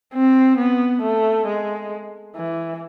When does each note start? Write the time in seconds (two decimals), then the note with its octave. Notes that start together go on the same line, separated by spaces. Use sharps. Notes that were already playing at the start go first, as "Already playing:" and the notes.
0.14 C4
0.58 B3
1.02 A3
1.47 G#3
2.36 E3